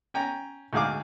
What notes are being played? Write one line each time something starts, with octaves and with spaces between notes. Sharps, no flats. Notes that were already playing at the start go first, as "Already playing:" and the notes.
C#4 G5 G#5 A#5
D2 G#2 G#4 F5 D6